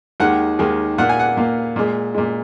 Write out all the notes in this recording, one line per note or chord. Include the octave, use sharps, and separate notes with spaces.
D#2 D#3 G#3 F#5
D#2 D#3 G#3
A#2 A#3 F#5
G#5
F#5
A#2 A#3
A#2 G#3
A#2 G#3